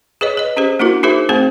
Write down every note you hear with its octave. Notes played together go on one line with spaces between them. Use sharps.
G#4 B4 C#5 D#5
B4 D#5
C#4 G4 G#4 C5
A#3 D4 E4 F#4 A#4
D#4 F#4 G#4 A#4 C5 E5
A3 C4 G#4 C5 G5